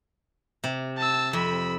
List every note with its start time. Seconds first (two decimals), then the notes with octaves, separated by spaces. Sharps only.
0.64 C3
0.98 A5 E6
1.33 F2 B5 E6